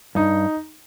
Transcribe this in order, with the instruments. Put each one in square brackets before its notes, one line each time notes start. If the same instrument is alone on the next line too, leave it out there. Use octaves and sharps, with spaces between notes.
[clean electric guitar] G2 [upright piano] D#4